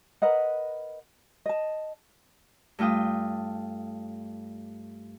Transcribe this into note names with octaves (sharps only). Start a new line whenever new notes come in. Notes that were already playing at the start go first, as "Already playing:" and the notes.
A#4 B4 D#5 F#5
D#5 A5
G2 A3 F4 G5 D#6